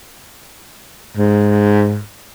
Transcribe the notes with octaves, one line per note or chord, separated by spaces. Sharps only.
G#2